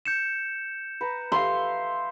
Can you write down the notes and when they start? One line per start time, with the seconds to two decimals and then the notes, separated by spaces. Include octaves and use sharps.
0.06 G6 C#7 E7
1.01 B4 A#5
1.32 E5 F5 C6